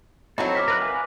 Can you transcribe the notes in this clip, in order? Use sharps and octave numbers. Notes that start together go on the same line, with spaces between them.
F#3 C4 D#4 E4 F#4 A4
D6 F6 B6
A#4 B4 F#6
B4 F5 G#5